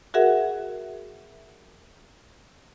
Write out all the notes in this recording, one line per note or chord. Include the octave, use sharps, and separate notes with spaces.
F#4 G#4 A#4 E5 F#5